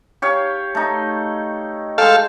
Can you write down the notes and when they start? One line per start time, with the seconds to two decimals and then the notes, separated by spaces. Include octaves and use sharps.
0.22 G4 C#5 F5
0.75 A3 D#4
1.98 G#3 A4 F5 G5